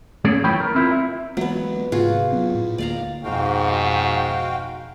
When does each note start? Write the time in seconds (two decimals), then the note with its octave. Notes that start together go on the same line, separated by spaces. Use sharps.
0.25 A3 A#3 C#4 G#4 C#5
0.44 F#2 E3 F3 C#5 G5 B5
0.60 A#4
0.75 C4 E4 F4 A#4
0.91 E5
1.37 E3 F#3 G#3 A#3 B3
1.92 G#2 C3 F4 F#4 G#4
2.31 F#3 B3 C4
2.55 A2
2.78 D2 A#3 D5 F5 A#5
3.24 F2 G#2 B2 F#4 F5 G5